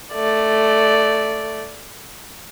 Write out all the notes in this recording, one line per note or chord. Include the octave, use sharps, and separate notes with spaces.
A3 D5